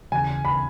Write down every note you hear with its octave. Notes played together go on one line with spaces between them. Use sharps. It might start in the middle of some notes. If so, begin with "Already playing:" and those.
D#2 C#3 E3 G#5
B5